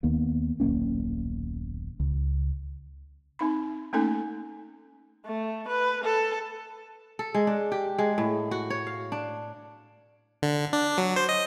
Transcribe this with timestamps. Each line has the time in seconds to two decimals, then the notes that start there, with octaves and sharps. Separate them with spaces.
0.03 D#2 D#3 A#3 B3
0.60 D#1 B1 A#3 C#4
2.00 C#2
3.39 C4 D#4 B5
3.93 A3 A#3 C#4 D#4 A4 G#5
5.26 A3
5.68 B4
6.04 A4
7.19 A4
7.34 G#3
7.47 D4
7.72 G4
7.98 G#3
8.18 A2
8.51 F#4
8.70 C#5
8.87 F5
9.12 D4
10.42 D3
10.73 D4
10.98 F#3
11.16 C5
11.29 D#5